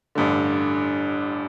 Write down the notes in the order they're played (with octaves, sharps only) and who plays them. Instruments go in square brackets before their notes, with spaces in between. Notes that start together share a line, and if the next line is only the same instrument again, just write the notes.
[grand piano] A1 G2 D3